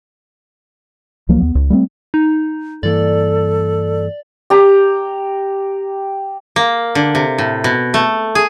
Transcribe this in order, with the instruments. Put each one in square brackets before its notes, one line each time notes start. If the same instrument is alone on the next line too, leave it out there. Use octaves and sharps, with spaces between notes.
[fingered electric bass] C#2 F3 F#3 A#3
D#2 B3
C#2
G3 A3 B3 C4
[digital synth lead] D#4
[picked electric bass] G2 E3 A#3 [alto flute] A4 [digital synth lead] D5
[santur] G4 A#5
[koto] A#3
D3
C3
A2
B2
A3
G#4